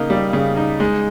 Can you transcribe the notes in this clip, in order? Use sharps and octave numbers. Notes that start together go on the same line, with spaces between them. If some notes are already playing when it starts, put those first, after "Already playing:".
Already playing: C#3 A#3 D#4
G3
C#3
D#4
G#3